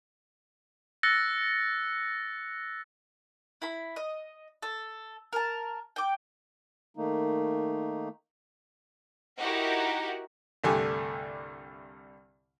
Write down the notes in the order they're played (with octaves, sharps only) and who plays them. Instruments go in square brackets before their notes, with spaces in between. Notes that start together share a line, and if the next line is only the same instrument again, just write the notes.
[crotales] E6 F#6 A6 A#6 C#7
[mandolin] E4 B5
D#5
A4
A#4 A5
G5 D6
[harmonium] D#3 A3 A#3 D#4
[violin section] D#4 E4 F#4 G4 A#4 F#5
[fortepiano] C2 G2 D3 A3 G4 G#5